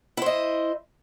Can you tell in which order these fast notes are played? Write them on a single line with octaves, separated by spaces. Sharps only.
E4 C5 D#5